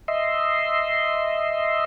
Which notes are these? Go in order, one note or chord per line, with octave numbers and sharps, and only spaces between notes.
D#5 E5 C6